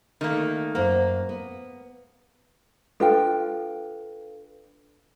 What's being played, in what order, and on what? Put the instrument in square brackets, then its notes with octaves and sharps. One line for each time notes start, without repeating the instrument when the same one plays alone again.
[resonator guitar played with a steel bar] D#3 A3 A#3
[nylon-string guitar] F#2 C5 F#5 [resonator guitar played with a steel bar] A#3
[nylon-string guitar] B3
[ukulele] D4 F4 G5 [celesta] A4 B4 F5